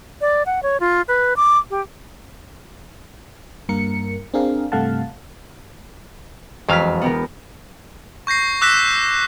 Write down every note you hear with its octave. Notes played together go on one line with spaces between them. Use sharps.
D5
F#5
C#5
F4
B4
D6
G4
G2 A#3 A#4 C#7
C4 D4 G#4 A#4 F5
G2 C3 A3 F5 F#5 A5
E1 F2 F#3 F5 F6 B6
B3 G4 A#4
C#6 G6 A#6 C7
D6 E6 F#6 A#6 B6 E7